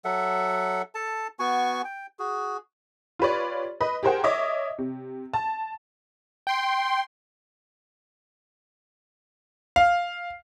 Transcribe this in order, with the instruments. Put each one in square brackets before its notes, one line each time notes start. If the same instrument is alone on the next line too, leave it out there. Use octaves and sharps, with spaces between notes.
[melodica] F#3 A4 E5 F#5
A4 A5
B3 F#4 G#5 C#6
G5
F#4 G#4
[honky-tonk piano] F4 G4 B4 C#5 D5
B4 D#5
G4 G#4 A#4 C5 F#5 G5
C#5 D#5 E5 D6
C3
A5
[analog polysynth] G5 C6
[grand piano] F5